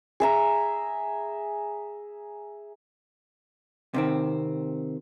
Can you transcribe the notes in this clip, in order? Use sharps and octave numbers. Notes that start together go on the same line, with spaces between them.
G#4 E5 A#5
C3 D#3 C4